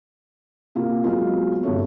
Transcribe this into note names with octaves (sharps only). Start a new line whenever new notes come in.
C3 A#3 F4
F#3 G#3 B3 F4
G1 C3 A3 C#5